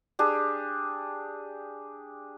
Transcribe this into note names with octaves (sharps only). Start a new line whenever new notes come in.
D4 G4 G#4